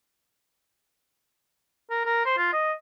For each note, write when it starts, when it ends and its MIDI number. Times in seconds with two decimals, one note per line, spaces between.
1.90 2.05 70
2.06 2.25 70
2.26 2.38 72
2.38 2.52 65
2.53 2.73 75